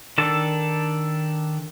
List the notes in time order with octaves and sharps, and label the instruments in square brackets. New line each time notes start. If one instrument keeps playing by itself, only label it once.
[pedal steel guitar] D#3 D4 A4 A5